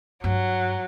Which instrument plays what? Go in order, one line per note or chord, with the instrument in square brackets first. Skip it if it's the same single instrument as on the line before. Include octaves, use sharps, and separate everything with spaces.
[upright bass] G2 [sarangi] F#3